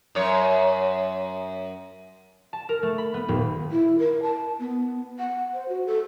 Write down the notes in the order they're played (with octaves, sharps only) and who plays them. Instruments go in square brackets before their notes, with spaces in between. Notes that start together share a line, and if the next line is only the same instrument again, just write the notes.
[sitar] F#2 C#5
[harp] A5
A#4
A3
B5
B3
D#1
[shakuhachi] E4
A#4
A5
B3
F#5
C5
F#4
A4